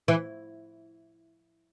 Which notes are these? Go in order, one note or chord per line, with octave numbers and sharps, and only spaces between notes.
E3